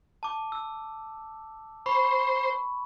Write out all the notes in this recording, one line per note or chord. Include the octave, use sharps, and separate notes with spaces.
A5 D6
E6
C5 B5 C#6